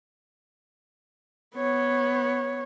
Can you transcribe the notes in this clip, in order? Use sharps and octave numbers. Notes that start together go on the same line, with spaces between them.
B3 C#5